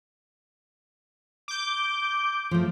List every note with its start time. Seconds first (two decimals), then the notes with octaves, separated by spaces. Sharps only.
1.48 D6 G6
2.51 F3 A3